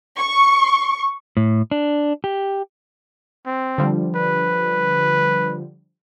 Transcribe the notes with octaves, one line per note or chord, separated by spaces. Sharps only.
C#6
A2
D4
G4
C4
D3 F3 G3
B4